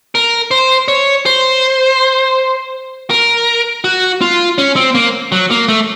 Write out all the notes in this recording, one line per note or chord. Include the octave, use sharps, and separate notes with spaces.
A#4
C5
C#5
C5
A#4
F#4
F4
C#4
C4
A#3
F#3
A#3
A3